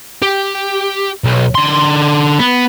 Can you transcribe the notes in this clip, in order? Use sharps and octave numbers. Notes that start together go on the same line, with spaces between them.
G4
B1
D3 C6
B3